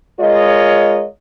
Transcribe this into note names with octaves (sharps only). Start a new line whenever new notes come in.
G#3 F4 A#4 C#5 D#5